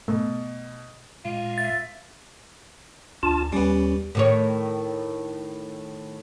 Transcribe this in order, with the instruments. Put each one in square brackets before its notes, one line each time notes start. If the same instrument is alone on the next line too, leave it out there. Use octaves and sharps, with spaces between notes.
[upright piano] B2 [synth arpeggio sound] A3
[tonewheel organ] A#2 G#3 [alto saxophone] F4
[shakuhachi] E5 [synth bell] A6
[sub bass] D2 [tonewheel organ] D4 F4 A5
[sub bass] D#2 [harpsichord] G3 B3 [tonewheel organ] C#4
[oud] A2 D#3 C#5